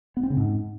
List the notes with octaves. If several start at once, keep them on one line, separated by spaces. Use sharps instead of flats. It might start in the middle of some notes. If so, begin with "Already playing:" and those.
B3
C4
C#3
G#2